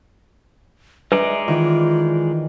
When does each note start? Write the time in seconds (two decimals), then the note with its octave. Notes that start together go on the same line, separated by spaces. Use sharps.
1.12 G#3 D#4 B4 D5 E5
1.48 D#3 E3 F4